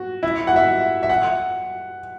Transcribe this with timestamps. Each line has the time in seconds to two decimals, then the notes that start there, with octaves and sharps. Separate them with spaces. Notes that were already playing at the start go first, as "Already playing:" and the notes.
Already playing: F#4
0.23 E4
0.47 F#5
0.56 E5
1.03 E5
1.09 F#5